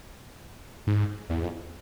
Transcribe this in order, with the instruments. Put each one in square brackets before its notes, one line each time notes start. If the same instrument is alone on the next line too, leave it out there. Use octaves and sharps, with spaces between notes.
[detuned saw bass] G#2
E2
F2